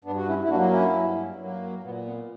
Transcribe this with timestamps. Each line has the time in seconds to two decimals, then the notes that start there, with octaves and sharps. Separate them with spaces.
0.04 G2 B3 D4
0.16 F#4
0.27 C#4 E4
0.43 E4
0.49 F#3 A#3 D4 F#4
0.72 C#4 E4
0.94 G2
1.39 F#3 A#3
1.83 A#2 B3
2.05 B3